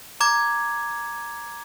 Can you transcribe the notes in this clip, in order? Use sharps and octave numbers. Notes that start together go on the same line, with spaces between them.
A#5 D6 G#6